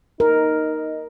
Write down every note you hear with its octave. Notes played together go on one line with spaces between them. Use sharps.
D#4 A#4